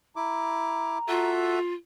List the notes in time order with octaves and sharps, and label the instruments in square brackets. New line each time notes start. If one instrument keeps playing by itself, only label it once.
[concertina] E4 D6 [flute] A#5
[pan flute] F4 [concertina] F#4 A4 E5